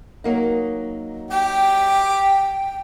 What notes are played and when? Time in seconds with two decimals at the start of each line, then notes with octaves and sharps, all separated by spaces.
0.24 F#3 A#3 D#4
1.31 G4 G5